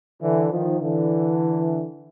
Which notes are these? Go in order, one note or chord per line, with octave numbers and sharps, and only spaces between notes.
D3 E3
D#3 F3
D3 E3